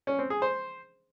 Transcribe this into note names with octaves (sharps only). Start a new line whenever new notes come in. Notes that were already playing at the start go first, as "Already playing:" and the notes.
C#4
C4
G#4
C5